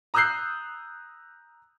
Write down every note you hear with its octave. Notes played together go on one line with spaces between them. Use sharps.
A#5 D#6 E6 F#6 G6 C7